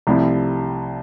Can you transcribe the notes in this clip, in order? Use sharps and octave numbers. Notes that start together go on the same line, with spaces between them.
C2 C3 F3 A3 E4